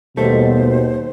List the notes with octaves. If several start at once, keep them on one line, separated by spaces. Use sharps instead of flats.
D#2 B2 G3 A3 A4 C5